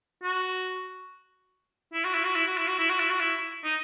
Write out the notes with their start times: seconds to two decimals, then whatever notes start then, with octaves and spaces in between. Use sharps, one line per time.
0.23 F#4
1.93 E4
2.05 F#4
2.14 E4
2.25 F#4
2.36 E4
2.47 F#4
2.58 E4
2.68 F#4
2.79 E4
2.90 F#4
3.00 E4
3.10 F#4
3.20 E4
3.64 D#4